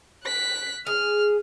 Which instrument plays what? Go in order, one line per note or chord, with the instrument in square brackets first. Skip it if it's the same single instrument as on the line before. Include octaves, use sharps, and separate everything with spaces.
[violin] F#6 B6
[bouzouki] G#4 [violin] F6